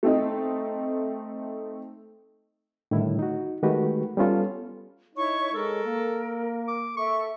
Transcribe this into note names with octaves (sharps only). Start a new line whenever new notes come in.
A3 C4 D#4
A2 D3 D#3 G3 E4
D#4 F#4
D#3 G#3 A3 F#4 G4 B4
G3 B3 C#4 F4 A4
D#4 E4 C#5 C#6
G#3 A4 A#4
A#3
D6
A4 E5 C#6